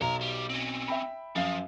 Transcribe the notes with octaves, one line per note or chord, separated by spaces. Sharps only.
B1 A4 A#5
G3
C4 C#4
E5 G5 B5
F#2 F3 F5